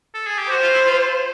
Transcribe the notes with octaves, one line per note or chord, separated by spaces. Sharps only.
A4
G#4
G4
F#4 C5
F4
E4
F4